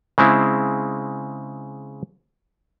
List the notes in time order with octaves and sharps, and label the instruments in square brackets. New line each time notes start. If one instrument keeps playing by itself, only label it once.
[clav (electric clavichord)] C#3 G#3 C4 E4